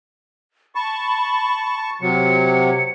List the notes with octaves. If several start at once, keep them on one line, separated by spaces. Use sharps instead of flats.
A5 B5 C#6
C3 F#3 C#7